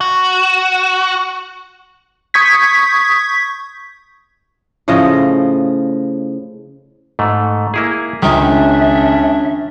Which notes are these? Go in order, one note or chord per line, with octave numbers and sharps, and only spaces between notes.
F#4
C#6 D#6 G6 G#6 B6
A2 C#3 F3 D#5
G#2 A3
A#3 E4 G#4
C#2 D#3 C#4 D4 E5